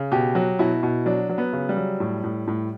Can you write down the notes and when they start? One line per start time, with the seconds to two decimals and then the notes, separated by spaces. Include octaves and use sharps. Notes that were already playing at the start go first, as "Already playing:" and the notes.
Already playing: C#3
0.12 B2 G4
0.35 F#3
0.59 B2 E4
0.83 B2
1.06 F#3 D4
1.29 F#3
1.38 B3
1.53 C#3
1.69 G3
1.77 F#3
2.00 A2
2.24 A2
2.48 A2